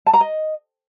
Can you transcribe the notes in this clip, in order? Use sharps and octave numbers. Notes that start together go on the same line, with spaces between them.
A5
A#5
D#5